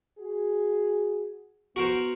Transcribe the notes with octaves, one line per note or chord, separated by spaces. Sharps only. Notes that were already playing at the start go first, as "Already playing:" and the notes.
F#4 G#4
E2 B3 F#4 A#4 C5